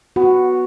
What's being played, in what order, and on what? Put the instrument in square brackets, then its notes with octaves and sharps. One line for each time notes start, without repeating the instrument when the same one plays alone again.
[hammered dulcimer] B3 [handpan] F#4